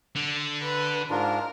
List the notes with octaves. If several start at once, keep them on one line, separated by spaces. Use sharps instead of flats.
D3
B4
G#2 D4 F4 A#4